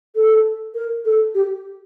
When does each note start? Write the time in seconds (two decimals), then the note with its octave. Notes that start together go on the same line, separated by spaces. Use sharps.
0.16 A4
0.75 A#4
1.05 A4
1.35 G4